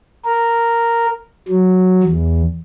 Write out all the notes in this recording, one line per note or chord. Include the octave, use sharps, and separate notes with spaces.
A#4
F#3
E2